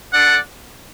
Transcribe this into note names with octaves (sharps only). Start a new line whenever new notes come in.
D4 A4 D5 F#5